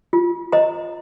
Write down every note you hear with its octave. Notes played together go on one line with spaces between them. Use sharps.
F4
C5 D#5 A#5